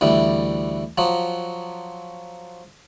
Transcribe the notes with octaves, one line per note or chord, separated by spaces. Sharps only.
D2 E3 G3
F3 F#3